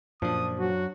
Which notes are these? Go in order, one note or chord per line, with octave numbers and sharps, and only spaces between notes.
F#2 A#2 F3 D4 D#6
F#3 F#4